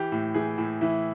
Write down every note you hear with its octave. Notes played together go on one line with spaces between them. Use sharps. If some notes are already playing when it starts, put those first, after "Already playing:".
Already playing: E3 G4
A2
E3 G#4
A2
E3 E4